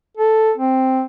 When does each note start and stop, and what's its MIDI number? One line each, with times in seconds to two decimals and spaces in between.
0.17 0.52 69
0.57 1.02 60